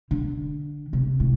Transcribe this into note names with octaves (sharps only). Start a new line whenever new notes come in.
D3
C3
A2